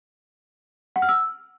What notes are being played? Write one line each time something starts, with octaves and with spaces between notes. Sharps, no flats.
F#5
F6
E6